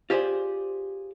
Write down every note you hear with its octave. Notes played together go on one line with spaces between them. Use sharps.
F4 G4 G#4 C5 D5